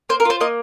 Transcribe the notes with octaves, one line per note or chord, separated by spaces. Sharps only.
A#3 C5
A#4
F4 C5
A#3 D#5